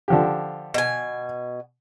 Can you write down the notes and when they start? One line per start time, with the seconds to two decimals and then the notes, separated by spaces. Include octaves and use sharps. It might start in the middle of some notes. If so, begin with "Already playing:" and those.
0.08 D3 F3 G4
0.74 B2 G#5